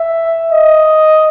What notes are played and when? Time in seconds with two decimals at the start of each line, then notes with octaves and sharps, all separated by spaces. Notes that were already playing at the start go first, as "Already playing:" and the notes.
Already playing: E5
0.52 D#5